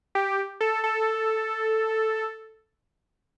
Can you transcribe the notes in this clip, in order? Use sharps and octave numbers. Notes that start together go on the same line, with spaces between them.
G4
A4
A4